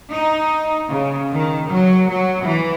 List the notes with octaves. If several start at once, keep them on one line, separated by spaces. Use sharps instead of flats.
D#4
C#3
D#3
F#3
F#3
E3